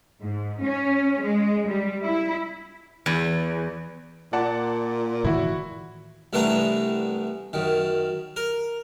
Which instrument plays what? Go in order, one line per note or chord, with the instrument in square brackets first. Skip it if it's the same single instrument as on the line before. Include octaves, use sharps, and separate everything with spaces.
[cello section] G#2
C#4
G#3
G3
E4
[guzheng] E2
[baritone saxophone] A#2 [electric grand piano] D5 F#5 A5
[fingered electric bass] A2 D#3 E3 [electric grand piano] E4 F#4
[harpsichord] C2 E3 A3 B3 D4 A#5
F#2 D#3
A#4